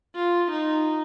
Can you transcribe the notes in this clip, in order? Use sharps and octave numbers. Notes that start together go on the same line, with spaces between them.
F4
D#4